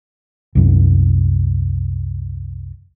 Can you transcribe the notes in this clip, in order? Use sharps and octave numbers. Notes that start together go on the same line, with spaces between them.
C2 F#2